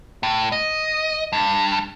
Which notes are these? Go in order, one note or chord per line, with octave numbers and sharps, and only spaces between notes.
A2
D#5
G2